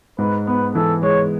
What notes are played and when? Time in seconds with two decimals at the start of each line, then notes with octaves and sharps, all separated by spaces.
0.18 G#2 B4
0.47 B3 B4
0.75 E3 A4
1.03 G#3 C#5